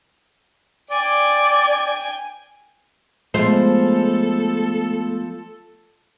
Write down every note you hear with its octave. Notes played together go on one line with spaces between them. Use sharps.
D5 G5 G#5
F3 G#3 A3 B3 A4 C5